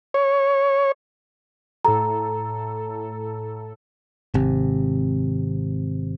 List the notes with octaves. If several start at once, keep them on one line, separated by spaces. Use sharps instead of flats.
C#5
A2 A4 A#5
G#1 C3